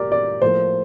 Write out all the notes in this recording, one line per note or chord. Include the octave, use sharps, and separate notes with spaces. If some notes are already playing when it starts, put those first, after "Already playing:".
Already playing: A#2 G4 A#4 D5
D5
A2 F3 A#3 C5